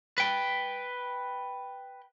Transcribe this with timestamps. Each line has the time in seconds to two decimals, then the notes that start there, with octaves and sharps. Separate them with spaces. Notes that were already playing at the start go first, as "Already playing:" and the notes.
0.18 B4 G5